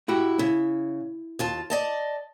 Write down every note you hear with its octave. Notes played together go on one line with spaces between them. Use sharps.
E4 F#4 G4
C#3 E4
D#2 F4 A5
D5 D#5 A5